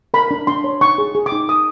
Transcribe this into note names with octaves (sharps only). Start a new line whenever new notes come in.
A#4 B5
D4
D4 C6
C#5
D#4 C#6
G#4
G#4
D6
D#4
A#4 D#6